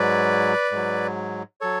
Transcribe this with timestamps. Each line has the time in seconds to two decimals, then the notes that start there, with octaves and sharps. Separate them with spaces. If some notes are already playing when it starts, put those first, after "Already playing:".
Already playing: G#2 F#3 B4 D5
0.72 G#2 F#3
1.61 F#3 A4 C#5